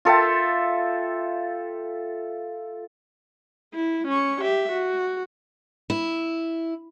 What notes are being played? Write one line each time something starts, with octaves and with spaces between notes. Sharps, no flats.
F4 A4 E5 G5
E4
C#4 C#6
G4 E5
F#4
E4